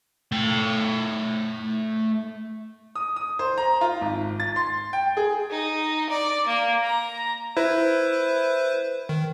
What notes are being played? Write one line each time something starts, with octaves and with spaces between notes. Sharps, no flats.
A3 G5
D#6
D#6
C5
A#5
F4
G#1
A6
C6
G5
G#4
D#4
D5
A#3
A#5
E4 B4 C5
D#3